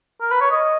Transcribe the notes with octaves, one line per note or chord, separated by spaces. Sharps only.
A#4
B4
C#5
D#5